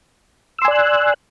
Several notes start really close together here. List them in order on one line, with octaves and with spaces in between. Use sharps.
E6 C6 G#5 D5 F#6